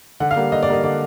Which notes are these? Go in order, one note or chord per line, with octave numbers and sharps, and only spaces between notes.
D3 F#5
F5
G3 A#3
D3 D#5
D5
G3 A#3 D#5
D3 D5